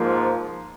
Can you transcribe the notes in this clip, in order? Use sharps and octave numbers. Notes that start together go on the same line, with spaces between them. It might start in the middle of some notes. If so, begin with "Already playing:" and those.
Already playing: G#2 F3 A#3 F4